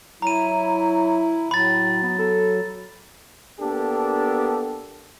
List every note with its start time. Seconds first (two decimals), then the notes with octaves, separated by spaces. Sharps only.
0.22 F#3 E4 A#5 D#7
1.51 A2 F#3 B5 A6
2.03 B3
2.19 A4
3.60 A#3 B3 D4 G4 A4